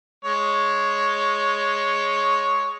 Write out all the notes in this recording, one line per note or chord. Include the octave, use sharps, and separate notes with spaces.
G#3 C#5